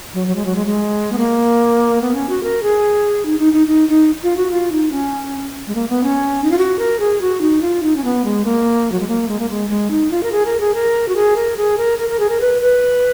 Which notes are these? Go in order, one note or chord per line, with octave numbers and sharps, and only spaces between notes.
F#3
F#3
G#3
F#3
G#3
G#3
B3
A#3
B3
C#4
F#4
A#4
G#4
D#4
D#4
D#4
D#4
D#4
F4
F#4
F4
D#4
C#4
G#3
A#3
B3
C#4
D#4
F4
F#4
A#4
G#4
F#4
D#4
F4
D#4
C#4
B3
G#3
A#3
F#3
G#3
A#3
G#3
A#3
G#3
G#3
D#4
F4
A#4
G#4
A#4
G#4
A#4
F#4
G#4
A#4
G#4
A#4
A#4
A#4
G#4
A#4
B4
B4